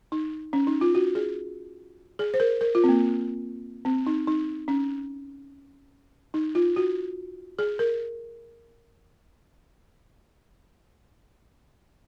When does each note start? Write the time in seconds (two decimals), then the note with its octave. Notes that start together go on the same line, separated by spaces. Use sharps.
0.12 D#4
0.53 C#4
0.67 D#4
0.81 F4
0.95 F#4
1.15 G#4
2.19 G#4
2.34 C5
2.40 A#4
2.61 A#4
2.75 F4
2.84 C4
2.89 A#3
3.85 C4
4.07 D#4
4.27 D#4
4.68 C#4
6.34 D#4
6.55 F4
6.76 F#4
7.59 G#4
7.79 A#4